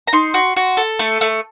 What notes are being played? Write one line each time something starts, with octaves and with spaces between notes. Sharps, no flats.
A#5
D#4 C6
F#4
F#4
A4
A3
A3